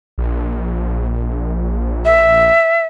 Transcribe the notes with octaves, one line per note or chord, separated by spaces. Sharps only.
A#1
E5